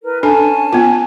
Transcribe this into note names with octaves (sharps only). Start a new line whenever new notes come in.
E4 A#4 B4
C#4 D4 A4 G#5 A5
B3 F4